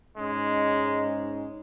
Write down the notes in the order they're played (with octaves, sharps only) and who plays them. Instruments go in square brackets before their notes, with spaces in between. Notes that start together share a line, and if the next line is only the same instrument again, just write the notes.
[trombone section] G#2 C#4 D#4 [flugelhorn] G#3